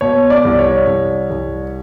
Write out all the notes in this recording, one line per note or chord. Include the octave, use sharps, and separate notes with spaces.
B2 C#5
D5
C2
C#5
C2
C2